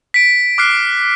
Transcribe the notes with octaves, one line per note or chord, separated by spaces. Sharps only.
B6 D7
D6 F6 F#6 C7